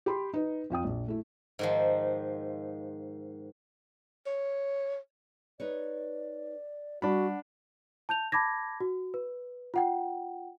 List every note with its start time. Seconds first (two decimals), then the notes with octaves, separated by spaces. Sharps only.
0.06 G4 B5 C6
0.34 D#4 B4
0.70 F2 F4 G5 D#6
0.84 A#1
1.08 A3 E4
1.59 G#2 D#3 F3
4.27 C#5
5.60 D#4 B4 C#5 D5
7.02 G3 D4 F#4 F#5 B5
8.09 A5 G6 F7
8.32 A5 B5 D6 G#6 A#6
8.81 F#4
9.14 B4
9.74 F4 F#5 G5